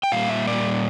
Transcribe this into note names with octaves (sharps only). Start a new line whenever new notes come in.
G5
A#2 G3 A#3 F5
E5
D5